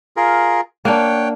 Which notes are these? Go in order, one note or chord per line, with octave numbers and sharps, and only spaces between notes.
F4 G#4 A#4
A#3 D4 C#5 F#5 G5